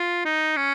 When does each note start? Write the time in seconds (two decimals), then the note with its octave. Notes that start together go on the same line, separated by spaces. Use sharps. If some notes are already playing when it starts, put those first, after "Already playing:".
Already playing: F4
0.25 D#4
0.56 C#4